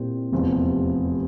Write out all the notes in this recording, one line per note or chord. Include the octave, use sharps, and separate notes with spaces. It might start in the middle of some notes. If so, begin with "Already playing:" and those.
Already playing: A#2 G3 C4 E4
F1 E2 C3 F3